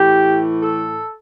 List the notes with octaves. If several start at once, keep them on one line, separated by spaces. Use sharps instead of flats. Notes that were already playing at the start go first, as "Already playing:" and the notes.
Already playing: A2 E3 G4
A4